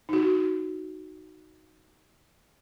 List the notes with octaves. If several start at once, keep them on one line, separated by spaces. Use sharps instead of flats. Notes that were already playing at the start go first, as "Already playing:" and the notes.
D#4 F#4